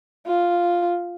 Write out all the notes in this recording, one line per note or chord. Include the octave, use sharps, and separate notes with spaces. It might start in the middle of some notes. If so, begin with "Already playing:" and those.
F4